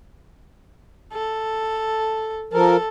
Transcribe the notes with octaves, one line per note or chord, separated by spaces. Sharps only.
A4
F3 A4 A#4